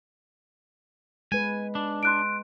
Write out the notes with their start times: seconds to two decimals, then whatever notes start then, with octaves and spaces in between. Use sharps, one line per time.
1.32 G#3 B4 G#5
1.75 D4
2.03 C6 F#6 D7